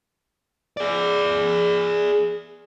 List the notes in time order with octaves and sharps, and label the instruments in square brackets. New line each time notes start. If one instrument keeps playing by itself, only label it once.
[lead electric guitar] G#4 D5